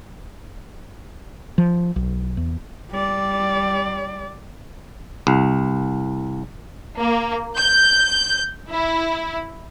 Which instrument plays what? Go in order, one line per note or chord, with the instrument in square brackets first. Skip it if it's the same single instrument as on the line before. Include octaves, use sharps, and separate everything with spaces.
[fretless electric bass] F3
B1
E2
[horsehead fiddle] G3 D5
[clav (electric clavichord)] C2
[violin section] A#3
G6
E4